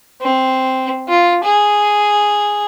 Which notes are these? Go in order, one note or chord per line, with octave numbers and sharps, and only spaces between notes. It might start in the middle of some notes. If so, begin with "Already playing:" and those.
C4
F4
G#4